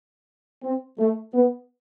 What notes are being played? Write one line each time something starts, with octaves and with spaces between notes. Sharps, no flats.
C4
A3
B3